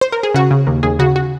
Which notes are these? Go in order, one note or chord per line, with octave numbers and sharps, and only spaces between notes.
C5
A#4
G#4
C#3 F#4
C#3
D#2
D#2 G#4
C#3 F#4
F#4